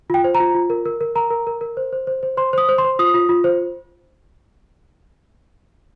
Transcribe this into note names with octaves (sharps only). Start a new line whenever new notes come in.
F4 G5
C5
A#5
F4
F4
A#4
A#4
A#4
A#4 A#5
A#4
A#4
A#4
C5
C5
C5
C5
C5 C6
C5 D#6
C5
C6
C5
F4 D#6
F4
F4
C5